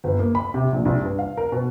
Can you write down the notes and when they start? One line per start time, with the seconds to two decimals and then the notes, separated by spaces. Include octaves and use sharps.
0.04 G1
0.19 A#3
0.35 B5
0.54 C3
0.72 A#1
0.85 C2
1.02 G2
1.19 F5
1.37 A#4
1.52 B2